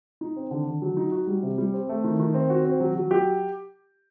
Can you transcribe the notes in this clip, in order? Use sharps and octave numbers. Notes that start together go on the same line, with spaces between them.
D#4
C4
D3
D3
F#3
D#4
F#4
G3
C3
G3
C4
A3
D#3
D#3
C4
F#4
C4
F#3
F#3
G4